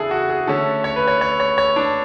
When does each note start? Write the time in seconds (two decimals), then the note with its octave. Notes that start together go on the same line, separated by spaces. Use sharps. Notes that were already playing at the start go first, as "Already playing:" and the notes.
Already playing: C#3 E3 B3 D4 E4 G#4 A4
0.11 F#4
0.30 G#4
0.47 D3 A3 C#4 A4
0.84 C#5
0.96 B4
1.08 C#5
1.21 C#5
1.40 C#5
1.58 C#5
1.76 D4